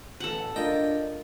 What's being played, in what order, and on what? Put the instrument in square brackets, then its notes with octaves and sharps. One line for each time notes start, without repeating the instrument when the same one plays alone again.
[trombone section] A1 [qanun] A4 F#5
[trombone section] D4 [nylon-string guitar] F4 A#4 [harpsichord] D#5 G5